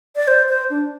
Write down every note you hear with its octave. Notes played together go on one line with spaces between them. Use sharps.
D5
C5
C5
D4